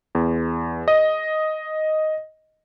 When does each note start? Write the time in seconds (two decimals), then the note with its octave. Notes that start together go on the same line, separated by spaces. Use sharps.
0.15 E2
0.88 D#5